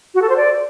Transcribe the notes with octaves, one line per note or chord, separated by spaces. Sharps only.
F#4
A4
C5
D5